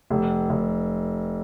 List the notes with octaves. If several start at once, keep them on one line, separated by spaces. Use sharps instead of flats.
F1
F1